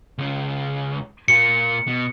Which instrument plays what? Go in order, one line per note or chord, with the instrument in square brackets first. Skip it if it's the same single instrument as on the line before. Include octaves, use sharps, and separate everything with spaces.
[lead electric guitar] C#2 C#3
[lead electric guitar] A#2 A#3 [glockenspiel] C#7
[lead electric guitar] B2